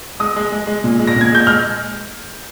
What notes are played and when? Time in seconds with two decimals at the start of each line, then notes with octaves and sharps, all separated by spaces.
0.20 G#3 D#6
0.36 G#3
0.52 G#3
0.67 G#3
0.84 A#2
0.99 G#3
1.07 A#6
1.16 A#2 G#6
1.32 G#3 G6
1.47 G#3 F6